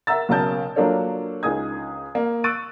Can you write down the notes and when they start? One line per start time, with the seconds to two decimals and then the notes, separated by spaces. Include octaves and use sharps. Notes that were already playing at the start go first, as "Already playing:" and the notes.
0.07 A#4 E5 F#5 A#5 E6 A6
0.29 B1 C#3 A#4 A5 G6
0.76 F#3 A#3 D4 F4 A4 C#5
1.43 C#2 D#4 G#4 D#6 G#6
2.15 A#3
2.44 C#6 E6 F#6 A6 D7 D#7